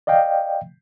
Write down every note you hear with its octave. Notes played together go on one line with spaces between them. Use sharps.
D5 D#5 F5 G5